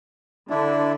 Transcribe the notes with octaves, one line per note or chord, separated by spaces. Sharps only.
D3 D4 E4